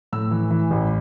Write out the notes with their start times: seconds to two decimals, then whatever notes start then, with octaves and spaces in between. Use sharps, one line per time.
0.13 A2 E6
0.31 E3
0.51 E3
0.71 A1